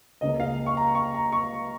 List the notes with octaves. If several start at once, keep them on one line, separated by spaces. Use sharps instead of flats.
C#2 C#3 A#3 D#5
F5
C#6
A#5
C#6
A#5
C#6